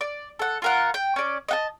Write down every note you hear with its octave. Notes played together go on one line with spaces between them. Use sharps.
D5
A4 F#5
F4 A#4 F#5
G5
C#4 D5
D#5 F#5 A5